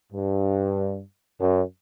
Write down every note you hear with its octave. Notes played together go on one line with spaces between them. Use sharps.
G2
F#2